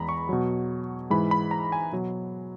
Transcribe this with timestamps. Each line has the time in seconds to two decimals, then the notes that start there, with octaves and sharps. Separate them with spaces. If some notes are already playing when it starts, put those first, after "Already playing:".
Already playing: E2 E3 G#3 A#5 B5
0.09 C#6
0.29 B2 F#3
1.10 G#2 E3 G#3 B5
1.31 B5
1.51 A#5
1.72 G#5
1.93 B2 F#3